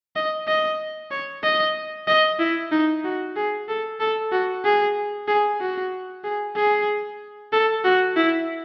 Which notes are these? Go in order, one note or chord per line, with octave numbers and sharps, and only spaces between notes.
D#5
D#5
C#5
D#5
D#5
E4
D#4
F#4
G#4
A4
A4
F#4
G#4
G#4
F#4
G#4
G#4
A4
F#4
E4